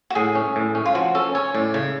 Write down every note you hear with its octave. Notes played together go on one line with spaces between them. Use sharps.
F#4
A2 G#4
C#4
A2
C#4
F4
F3 F#4
C#4 A4
C#4 C#5
A2 D5
C#3 C#5